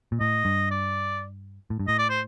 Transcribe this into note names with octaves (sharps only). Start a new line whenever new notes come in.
A#2
A2 D#5
G2
D5
A2
G2
A2 D#5
D5
C5